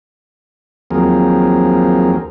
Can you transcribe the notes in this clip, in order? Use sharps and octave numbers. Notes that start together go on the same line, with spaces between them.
D#2 F3 F#3 C4 G#4 A#4